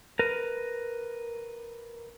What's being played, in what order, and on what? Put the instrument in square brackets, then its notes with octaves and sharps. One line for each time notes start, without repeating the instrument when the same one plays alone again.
[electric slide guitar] A#4 B4